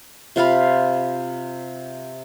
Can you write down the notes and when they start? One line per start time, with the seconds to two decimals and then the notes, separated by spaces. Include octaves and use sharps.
0.36 C3 F4 F5 B5